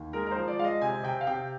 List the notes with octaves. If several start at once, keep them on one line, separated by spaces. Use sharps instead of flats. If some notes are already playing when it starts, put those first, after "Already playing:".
Already playing: D#2
G#3 A#4
A#4
F3 C5
D5
G#3 F5
D#5
C3 G#5
C3 G5
F5
C3 G5